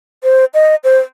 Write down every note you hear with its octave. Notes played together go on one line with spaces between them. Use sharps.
C5
D#5
C5